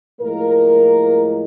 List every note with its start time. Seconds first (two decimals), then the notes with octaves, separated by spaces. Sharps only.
0.21 A2 F3 G#3 A#3 A#4